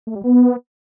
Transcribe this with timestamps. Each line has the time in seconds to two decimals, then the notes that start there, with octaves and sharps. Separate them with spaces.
0.07 A3
0.15 G3
0.24 B3